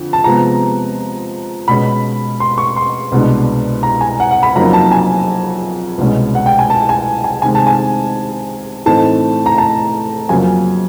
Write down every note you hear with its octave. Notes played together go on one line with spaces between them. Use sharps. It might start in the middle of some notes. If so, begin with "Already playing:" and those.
Already playing: F2 D3
A5
C3 F3 G#3 B3 A#5
B2 G#3 C#4 B5
C6
C#6
C6
C2 B2 G#3 B3 D4
A#5
G#5
F#5
F#5
B5
F2 C#3 F#3 A#3 D#4 A#5
A5
G#5
C2 B2 G#3 C#4
F#5
G5
G#5
A5
G#5
G#5
C3 D#3 G#3 G#5
A5
G#5
A2 E3 A3 C4 D#4 A5
A#5
A5
F2 C#3 F#3 A#3 G#5